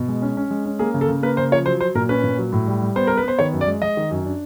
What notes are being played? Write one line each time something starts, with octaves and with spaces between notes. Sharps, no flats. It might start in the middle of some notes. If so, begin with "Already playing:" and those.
Already playing: B2
G#3
C#4
C#4
G#3
C#4
A#3 G#4
C#3
A4
C#3
A#3 B4
C#3 C5
F3 C#5
F#3 C5
F#3 C5
A#2 A#4
C#4 B4
A#2
F#3
A2
G3
G3
B3 C5
B3 A#4
B4
B3 C5
D#3 C#5
F#2
D5
G#3
G#3 D#5
D#3
F#2
D4